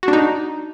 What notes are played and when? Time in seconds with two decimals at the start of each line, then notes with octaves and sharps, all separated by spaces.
0.03 F#4
0.08 D4
0.13 D#4